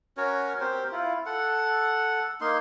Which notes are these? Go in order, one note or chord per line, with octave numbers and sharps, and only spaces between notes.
C#4 F#4 A#4 C#5
C4 G4 A#4 C5
E4 F4
A4 F#5
A#3 D#4 C6